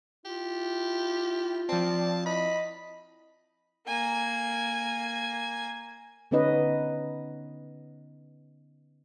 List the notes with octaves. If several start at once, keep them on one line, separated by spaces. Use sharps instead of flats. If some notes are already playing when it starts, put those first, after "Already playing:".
E4 F4 G4
F3 C4 D5 A5
E4 D#5 B5
A#3 G#5
D3 B3 C#4 D#4 B4 D#5